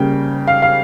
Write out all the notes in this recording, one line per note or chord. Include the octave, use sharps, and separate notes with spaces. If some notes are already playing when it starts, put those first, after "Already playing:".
Already playing: C#3 G3 A#3 G5
F5
F5